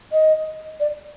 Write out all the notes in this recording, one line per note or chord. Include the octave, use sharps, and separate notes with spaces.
D#5
D5